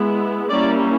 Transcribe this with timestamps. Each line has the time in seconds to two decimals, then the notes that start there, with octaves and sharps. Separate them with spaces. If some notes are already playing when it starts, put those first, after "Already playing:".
Already playing: G#3 B3 E4
0.50 G3 A#3 C#4 E4 D5